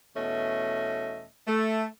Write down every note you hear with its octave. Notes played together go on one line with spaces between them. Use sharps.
E2 B2 A3 C#4 D#5 E5
A3